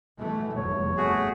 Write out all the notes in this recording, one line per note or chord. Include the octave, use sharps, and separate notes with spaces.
B2 E3 A3
F1 E2 G2 C#5
A3 F#4 G#4